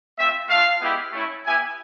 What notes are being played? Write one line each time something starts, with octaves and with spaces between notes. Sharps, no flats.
A3 C4 F4 E5
A3 D4 F4 F5
G#3 B3 E4 G4
A3 C#4 E4
B3 E4 G4 G#5